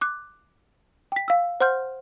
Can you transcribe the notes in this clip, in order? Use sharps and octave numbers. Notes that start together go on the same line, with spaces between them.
D6 F#6
G5 B6
F5 E6
C5 F#5 C6 F6 G6